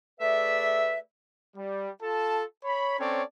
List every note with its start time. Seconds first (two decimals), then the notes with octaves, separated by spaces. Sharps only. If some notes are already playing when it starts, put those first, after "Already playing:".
0.20 A3 G#4 B4 D5 E5
1.57 G3
2.02 F4 A4 A5
2.64 C#5 B5
2.99 C4 C#4 A4 C#5 D5